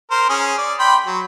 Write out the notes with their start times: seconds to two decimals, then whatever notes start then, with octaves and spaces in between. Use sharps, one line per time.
0.11 A#4 C5
0.29 C#4 G#4
0.58 D5
0.79 G5 B5 C6
1.06 F#3